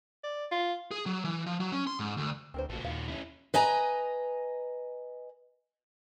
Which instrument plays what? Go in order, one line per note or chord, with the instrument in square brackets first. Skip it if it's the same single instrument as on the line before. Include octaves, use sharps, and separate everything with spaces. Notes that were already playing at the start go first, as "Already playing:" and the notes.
[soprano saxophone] D5
F4
[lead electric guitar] G#4
F#3
E3
F3
F#3
C#4
C6
G#2
D2
[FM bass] D2 [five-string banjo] C4 A#4 C5
[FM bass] A1 [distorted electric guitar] A#2 F#4 [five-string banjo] A3
[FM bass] D#2 [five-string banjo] F5
[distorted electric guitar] C#4 E4
[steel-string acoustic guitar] B4 D#5 G#5 A#5